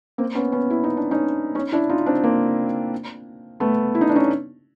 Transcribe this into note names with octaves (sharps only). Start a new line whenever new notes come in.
A#3 C4
B3 C#4
B3 C#4
E4
D#4
D4
C#4 D#4
C#4 D#4
D4 E4
D#4 F4
C4 D4
A#3 C4
A3 B3
E4
D#4
D4
C#4 D#4